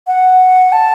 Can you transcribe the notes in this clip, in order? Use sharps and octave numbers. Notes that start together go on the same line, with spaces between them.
F#5
A5